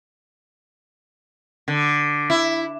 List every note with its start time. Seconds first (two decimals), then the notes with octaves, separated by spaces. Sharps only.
1.68 D3
2.30 E4